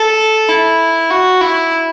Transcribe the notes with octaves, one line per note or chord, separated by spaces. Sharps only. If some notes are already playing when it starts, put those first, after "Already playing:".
Already playing: A4
E4
F#4
E4